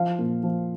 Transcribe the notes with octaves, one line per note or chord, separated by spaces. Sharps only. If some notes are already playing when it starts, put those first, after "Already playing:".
Already playing: F3 F5
A#2
F3